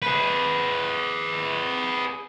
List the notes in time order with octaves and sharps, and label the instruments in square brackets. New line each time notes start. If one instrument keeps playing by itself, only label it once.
[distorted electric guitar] G#4 B4